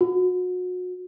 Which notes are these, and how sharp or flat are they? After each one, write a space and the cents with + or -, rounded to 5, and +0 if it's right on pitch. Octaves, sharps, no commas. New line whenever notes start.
F#4 -30